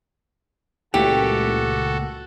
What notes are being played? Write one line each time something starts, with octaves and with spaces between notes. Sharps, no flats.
C#2 A#2 E3 A3 F#4 G4 A4